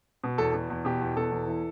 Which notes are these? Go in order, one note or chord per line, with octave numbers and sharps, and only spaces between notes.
B2
E2 A4
B2
E2
B2 G4
E2
B2 A4
E2
E3